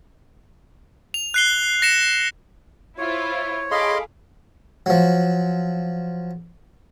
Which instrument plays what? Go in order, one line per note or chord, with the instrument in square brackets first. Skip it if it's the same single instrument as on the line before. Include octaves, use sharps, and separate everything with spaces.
[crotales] F7
F#6 C7 G7
A#6 C#7 E7
[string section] E4 F4 C5 [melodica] C#5
[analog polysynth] G#4 A4 F5 [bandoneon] D#5 C6 [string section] B5 D6
[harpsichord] F3 F#3